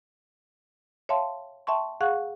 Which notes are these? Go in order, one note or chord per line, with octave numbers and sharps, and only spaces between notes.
C#5 E5 F5 G5 A5 C6
E5 G5 A5 C6 C#6
G#4 F5 F#5 C#6 F#6